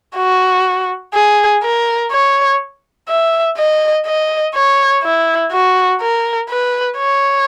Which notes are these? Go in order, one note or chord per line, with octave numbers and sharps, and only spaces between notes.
F#4
G#4
A#4
C#5
E5
D#5
D#5
C#5
E4
F#4
A#4
B4
C#5